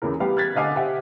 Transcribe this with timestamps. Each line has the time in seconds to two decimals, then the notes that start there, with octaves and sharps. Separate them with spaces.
0.02 E2 C#3 E3 A#4
0.20 G3 B3 G4 F5
0.37 F6 F#6 G#6 A6 B6
0.56 D3 D#5 F5 G#5 D6
0.76 G4 C5 E5 F#5